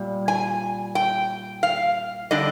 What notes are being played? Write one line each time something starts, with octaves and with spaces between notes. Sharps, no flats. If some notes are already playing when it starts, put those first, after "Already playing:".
Already playing: A#2 G3
G#5
G5
F5
D3 G3 D4 D#5